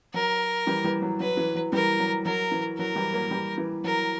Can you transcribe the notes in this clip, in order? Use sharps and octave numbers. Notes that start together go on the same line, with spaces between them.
F#3 A#4
E3 G3
E3 G3
F#3
F#3 B4
E3
F#3
E3 G3 A#4
F#3
F#3 A#4
E3
F#3 A#4
E3 G3
F#3 A#3
E3 G3
E3
F#3 A#4